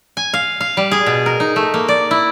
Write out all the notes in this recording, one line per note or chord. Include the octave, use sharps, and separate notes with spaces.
G#5
F5
F5
G3
G#4
B2
A#4
D#4
A3
A#3
D5
E4